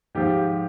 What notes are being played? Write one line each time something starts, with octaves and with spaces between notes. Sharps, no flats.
G#2 F3 G4